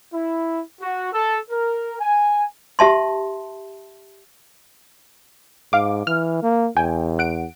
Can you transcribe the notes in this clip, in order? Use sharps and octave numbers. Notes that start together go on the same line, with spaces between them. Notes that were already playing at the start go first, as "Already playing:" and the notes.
E4
F#4
A4
A#4
G#5
G4 E5 A5 C6
G#2 F5 D6
E3 F6
A#3
E2 G5 G#5
F#5 D7